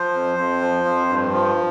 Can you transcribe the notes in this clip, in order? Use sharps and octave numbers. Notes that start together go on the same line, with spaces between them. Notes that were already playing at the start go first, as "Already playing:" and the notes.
Already playing: F3 C5
F2
F2
F3
F2
G2
F3